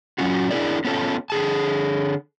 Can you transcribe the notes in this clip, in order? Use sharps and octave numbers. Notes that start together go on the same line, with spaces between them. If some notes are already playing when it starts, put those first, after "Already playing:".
F#3 C#4 F4 F#4
D4 E4 F4 G#4 A#4 D5
B3 C#4 F4 A4
D3 G#4 A5